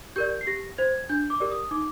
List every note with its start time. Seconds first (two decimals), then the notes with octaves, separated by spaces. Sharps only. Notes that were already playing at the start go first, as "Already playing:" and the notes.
0.16 G4 A#4 D5 G6
0.41 C7
0.47 G4 A#6
0.78 C5 G#6
1.09 D4 G6
1.30 D6
1.40 G4 A#4 D5
1.51 D#6
1.71 D#4 D6